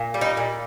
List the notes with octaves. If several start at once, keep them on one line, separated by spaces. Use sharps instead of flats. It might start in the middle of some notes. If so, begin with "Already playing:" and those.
Already playing: A#2
G3
D#4
A#2